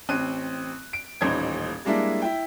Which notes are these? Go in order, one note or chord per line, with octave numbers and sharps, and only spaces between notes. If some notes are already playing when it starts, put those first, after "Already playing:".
A1 C4 F#6 D#7
D7
D#1 A1 D#4 C5 G#6
G3 G#3 A#3 D4 E4
E4 G5